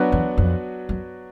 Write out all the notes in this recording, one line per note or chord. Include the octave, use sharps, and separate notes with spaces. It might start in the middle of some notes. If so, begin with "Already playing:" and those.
Already playing: F#3 B3 D4 F#4 B4
E2
F2
F#2